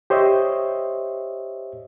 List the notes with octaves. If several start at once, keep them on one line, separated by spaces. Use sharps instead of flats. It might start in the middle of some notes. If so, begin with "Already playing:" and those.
G4 C5 C#5 D#5 E5